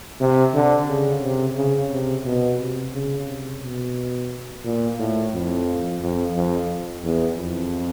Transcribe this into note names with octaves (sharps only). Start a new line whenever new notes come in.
C3
D3
C#3
C3
C#3
C3
B2
C3
C#3
C3
B2
A#2
A2
F2
F2
F2
E2
F2